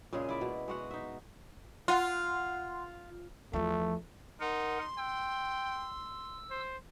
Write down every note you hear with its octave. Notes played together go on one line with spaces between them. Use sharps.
A#2 C#3 G#3 G#4
E4 D5 E5
B2
G#3 F#4 F#5
D#4 E5
F4 F#5 C6
E2 F3 A3
D#4 A#4 F#5 C6
G5 E6
C5